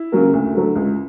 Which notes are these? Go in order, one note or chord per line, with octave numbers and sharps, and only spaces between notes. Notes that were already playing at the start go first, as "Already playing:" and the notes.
Already playing: E4
C#3 F#3 A#3
D2
D3 F#3 A3
C#2